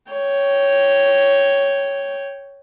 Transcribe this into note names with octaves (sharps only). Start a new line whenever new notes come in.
C#5 G5